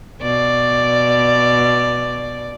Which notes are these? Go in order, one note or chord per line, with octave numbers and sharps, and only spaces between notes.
B2 D5